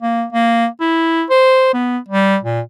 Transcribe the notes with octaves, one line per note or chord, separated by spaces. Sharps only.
A#3
A#3
E4
C5
B3
G3
A#2